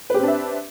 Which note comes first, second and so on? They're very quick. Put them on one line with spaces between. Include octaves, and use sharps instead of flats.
B4 G4 C4 D4 E5